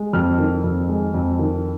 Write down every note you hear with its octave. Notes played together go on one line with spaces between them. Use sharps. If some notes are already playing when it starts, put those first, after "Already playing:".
Already playing: G#3
F2 F6
D#3
F2
G#3
F2
D#3